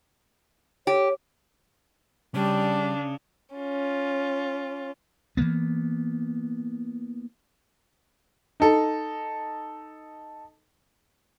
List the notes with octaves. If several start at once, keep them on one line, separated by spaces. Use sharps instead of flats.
G4 C#5
C#3 G3 D4
C#4 F4
E3 F3 A#3 B3
D#4 A4